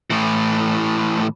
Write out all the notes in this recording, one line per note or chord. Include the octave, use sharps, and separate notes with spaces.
A2 E3